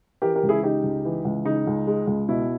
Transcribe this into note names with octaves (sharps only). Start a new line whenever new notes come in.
E3 G4 A#4
G4 A#4
C#2
E4 G#4
C#3 D#4 G4
C#2
E3
C#2
C#3 D#4
C#2
G#3
C#2
B2 E4